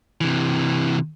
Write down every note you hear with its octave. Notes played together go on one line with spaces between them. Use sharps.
C3 E3